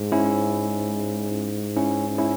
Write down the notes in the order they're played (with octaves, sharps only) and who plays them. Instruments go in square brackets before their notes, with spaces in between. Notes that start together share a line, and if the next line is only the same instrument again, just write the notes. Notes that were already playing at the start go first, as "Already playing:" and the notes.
Already playing: [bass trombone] G#2
[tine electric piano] C#4 E4
C#4 E4
C#4 E4